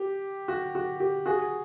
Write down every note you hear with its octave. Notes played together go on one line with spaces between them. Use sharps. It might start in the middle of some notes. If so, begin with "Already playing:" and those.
Already playing: G4
F#4
F#4
G4
F#4 G#4